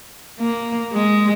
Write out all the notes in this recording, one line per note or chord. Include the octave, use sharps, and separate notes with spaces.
A#3
G#3